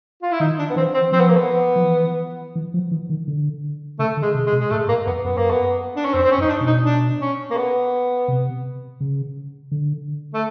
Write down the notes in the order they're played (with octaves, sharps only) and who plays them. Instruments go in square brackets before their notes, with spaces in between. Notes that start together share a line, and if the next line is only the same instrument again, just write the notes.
[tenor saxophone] F4
E4
[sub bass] D#3 [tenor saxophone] D#4
[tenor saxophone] D4
B3
[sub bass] E3 [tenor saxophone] C4
[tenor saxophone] C4
[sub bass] F3 [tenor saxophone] C4
[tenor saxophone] B3
A#3
B3
[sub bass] F3
E3
E3
F3
E3
D#3
D3
[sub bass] C#3 [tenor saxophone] A3
[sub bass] D3
[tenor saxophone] G#3
[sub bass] C3
[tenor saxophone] G#3
[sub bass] B2
[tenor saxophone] G#3
[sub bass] A2 [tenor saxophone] A3
[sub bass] G#2 [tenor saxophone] A#3
[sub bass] F#2 [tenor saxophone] B3
[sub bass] F#2 [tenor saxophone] B3
[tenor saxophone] A#3
B3
D4
C#4
[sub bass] F2 [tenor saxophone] C4
[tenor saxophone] C4
C#4
[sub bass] F#2
[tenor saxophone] D#4
D4
[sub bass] B2
[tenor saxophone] D#4
D4
C#4
A#3
B3
[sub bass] C3
C#3
D3
[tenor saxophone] A3